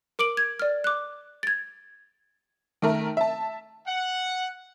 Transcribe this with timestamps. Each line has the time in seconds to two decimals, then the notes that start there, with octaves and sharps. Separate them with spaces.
0.19 A#4 D6 D7 F#7
0.37 G#6
0.59 D5 F6
0.84 D6 F#6
1.43 G#6 A6
2.82 D#3 A3 A#4
3.17 E5 A5
3.87 F#5